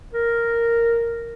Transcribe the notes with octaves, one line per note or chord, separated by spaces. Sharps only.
A#4